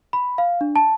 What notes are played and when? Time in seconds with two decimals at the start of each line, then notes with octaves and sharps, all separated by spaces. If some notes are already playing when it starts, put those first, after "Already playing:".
0.13 B5
0.38 F5
0.61 D4
0.76 A5